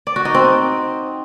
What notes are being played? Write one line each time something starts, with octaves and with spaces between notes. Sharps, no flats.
D5
F#4
D#4
C4